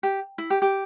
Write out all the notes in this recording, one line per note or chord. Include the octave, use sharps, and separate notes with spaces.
G4
E4
G4
G4